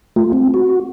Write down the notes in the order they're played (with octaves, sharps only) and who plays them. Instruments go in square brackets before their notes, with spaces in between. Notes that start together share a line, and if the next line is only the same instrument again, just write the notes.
[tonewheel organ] A3 F4
C4
F#4